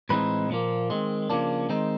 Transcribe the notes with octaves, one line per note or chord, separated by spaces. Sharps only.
A2 E3 G#3 C4 D#4 B4
A#2 F3 A#3
D#3 G#3 C4
C#3 F3 A#3 D4
D#3 G#3 C4 D#4